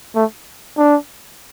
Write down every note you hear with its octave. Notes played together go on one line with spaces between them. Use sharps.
A3
D4